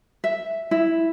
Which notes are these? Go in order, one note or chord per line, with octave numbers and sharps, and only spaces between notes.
E5
E4